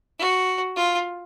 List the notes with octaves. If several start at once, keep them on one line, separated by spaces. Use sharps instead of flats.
F#4
F4